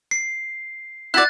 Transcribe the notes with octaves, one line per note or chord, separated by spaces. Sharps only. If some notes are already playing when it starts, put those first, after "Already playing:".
C7
E4 F#4 D5 F#6 A6